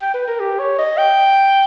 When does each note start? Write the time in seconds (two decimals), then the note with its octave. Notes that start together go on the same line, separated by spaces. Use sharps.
0.02 G5
0.14 B4
0.28 A#4
0.40 G4
0.59 C#5
0.79 D#5
0.98 G5